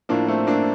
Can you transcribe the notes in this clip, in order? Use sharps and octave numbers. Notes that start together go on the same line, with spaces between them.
A2 F3 A#3 D4
A3 C4
A#3 D4